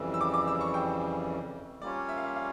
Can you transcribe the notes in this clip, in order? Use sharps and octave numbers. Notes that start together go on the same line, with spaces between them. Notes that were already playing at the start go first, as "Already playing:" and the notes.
Already playing: F2 C#3 E3 G3 E6
E6
D6
D6
E6
C#6
G5
G3 A#3 C#4 F4 C#5 D5
E5
F5
E5
F5